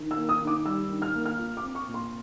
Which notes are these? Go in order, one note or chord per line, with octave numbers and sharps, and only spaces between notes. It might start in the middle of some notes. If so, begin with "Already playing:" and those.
Already playing: D#3
E6
A#3
D#6
D#3
D6
G3 E6
D#3
F6
A#3
F6
F4
D6
C4
C#6
A#2
C6